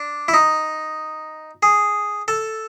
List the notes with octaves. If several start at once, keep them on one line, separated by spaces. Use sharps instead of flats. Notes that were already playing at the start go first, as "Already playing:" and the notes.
Already playing: D4
E4
D#4
G#4
A4